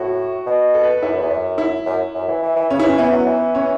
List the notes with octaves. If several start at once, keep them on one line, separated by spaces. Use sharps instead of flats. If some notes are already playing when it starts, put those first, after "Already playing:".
Already playing: A2 F#4
B2
A4
B4
F#2 E4
E2
F#2
E4
F#2
F#2
E3
E3
E3
C#3 C#4
E3 E4
C#4
E3 B3
F#3
E3
C#4